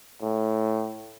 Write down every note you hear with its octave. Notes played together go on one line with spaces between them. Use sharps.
A2